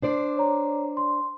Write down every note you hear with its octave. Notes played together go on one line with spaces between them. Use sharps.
D4 C5 D5
C#5 A#5
C6